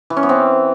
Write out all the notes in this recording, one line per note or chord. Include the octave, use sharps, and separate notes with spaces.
E3
C#4
B3
C4